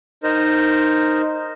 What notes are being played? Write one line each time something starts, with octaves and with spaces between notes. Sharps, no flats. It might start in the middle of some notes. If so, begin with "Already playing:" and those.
D#4 A#4 C5